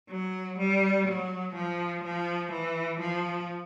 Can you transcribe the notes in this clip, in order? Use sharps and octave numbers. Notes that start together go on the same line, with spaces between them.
F#3
G3
F#3
F3
F3
E3
F3